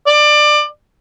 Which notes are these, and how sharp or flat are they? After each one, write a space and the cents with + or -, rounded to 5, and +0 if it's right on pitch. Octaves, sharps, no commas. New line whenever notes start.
D5 +25